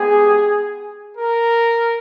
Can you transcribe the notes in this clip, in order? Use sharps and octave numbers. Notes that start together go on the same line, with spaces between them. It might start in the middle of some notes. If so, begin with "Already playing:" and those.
Already playing: G#3 B3 G4 G#4
A#4